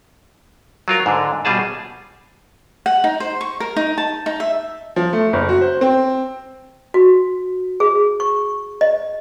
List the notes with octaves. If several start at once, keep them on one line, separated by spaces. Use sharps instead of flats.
F#3 F4 A#4
G#2 D3 D4
B2 G3 F4 G#4 A5
F#5
D#4
C5
C#6
A#4
D#4
A5
D#4
E5
F3
A3
F#1
F#4
C5
C4
F#4
G#4
C#6
D#5